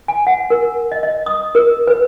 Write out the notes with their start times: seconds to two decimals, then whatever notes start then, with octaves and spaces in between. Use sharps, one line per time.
0.08 G#5
0.27 F#5
0.50 A#4
0.92 D#5
1.03 D#5
1.26 D#6
1.55 A#4
1.87 B4